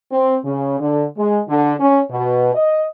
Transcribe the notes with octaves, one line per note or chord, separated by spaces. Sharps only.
C4
C#3
D3
G#3
D3
C#4
B2
D#5